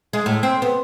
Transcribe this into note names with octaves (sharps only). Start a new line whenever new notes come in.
G#3
A2
C4
B3